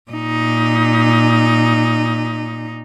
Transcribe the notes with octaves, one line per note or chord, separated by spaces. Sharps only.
A#2 D#4